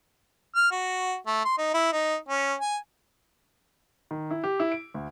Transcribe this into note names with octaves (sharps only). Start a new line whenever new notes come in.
F6
F#4
A3
C6
D#4
E4
D#4
C#4
G#5
D#3
E4
G4
E4
D7
D2